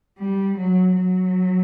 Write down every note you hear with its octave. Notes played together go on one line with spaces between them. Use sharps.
G3
F#3
F#3